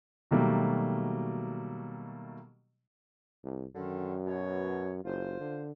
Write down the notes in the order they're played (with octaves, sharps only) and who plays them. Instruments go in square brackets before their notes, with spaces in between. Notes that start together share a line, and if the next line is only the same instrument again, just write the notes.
[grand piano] B2 D#3 F#3 G3 A3 A#3
[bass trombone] C2
[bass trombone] F#2 [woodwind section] D3 D#3
[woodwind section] B2 C#5
[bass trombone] F#1 [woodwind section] F4 C5
[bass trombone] D3